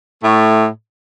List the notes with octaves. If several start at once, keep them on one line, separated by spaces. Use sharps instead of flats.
A2 A3